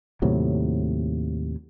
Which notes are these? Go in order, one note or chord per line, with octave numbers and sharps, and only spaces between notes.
D#2 A2 C3 F#3